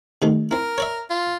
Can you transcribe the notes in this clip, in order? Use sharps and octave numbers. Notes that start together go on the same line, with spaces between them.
C3 D#3 A3
C4 E4 A#4
C#5 D5 E5
F4